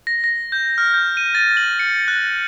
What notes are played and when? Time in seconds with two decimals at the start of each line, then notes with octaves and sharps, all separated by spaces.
0.07 A#6
0.24 A#6
0.52 G6
0.78 F6
0.94 G6
1.17 D#7
1.35 A6
1.57 F#7
1.79 C#7
2.08 F#6